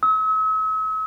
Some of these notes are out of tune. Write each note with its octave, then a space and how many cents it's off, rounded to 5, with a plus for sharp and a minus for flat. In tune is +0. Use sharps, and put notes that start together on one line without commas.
E6 -45